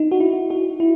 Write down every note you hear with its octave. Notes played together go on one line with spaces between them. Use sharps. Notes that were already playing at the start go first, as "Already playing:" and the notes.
Already playing: D#4
F#4
E4
F#4
E4